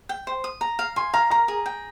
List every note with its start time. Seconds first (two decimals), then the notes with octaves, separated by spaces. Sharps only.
0.09 G5
0.27 C5
0.44 D#6
0.61 A#5
0.79 F5
0.96 G#5 C6
1.14 F5 A#5
1.31 A#4 A#5
1.48 G#4
1.66 G5